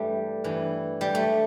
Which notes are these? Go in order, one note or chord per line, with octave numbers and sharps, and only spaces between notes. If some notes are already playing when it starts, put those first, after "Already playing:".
Already playing: G2 E3 G3 A3
G2 E3
G3
A3